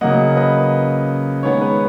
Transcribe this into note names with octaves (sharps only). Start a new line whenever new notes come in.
C#3 F#3 A#3 D#5 F#5
B4 D#5
D#3 G#3 B3 C#5
B4